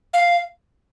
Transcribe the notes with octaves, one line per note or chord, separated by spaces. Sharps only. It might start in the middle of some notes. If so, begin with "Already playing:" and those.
F5